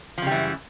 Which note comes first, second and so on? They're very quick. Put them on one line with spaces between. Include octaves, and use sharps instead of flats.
F3 C#3 G3 E3 F#2